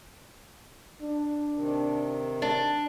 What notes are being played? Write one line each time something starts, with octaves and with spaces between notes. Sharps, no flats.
D4
C3 D#3
D4